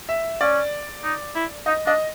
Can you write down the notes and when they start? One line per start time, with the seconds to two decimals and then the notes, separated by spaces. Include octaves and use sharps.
0.09 E5
0.41 C#4 D5
1.04 D#4
1.35 E4
1.66 D#4 D#5
1.87 D4 D#5